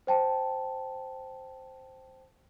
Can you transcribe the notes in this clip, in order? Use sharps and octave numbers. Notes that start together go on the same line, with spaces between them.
C5 G5 A5